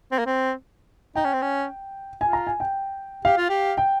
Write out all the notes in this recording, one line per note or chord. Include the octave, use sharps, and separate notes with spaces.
C4
A#3
C4
D#4 G5
C#4
C4
C#4
F4 G#5
A#5
G#5
G5
G4 F5
F4
G4
G5